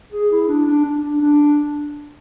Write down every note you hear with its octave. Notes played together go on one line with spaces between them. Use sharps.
G#4
E4
D4
D4
D4
D4